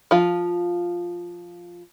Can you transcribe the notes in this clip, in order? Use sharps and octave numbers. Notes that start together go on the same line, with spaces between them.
F3 F4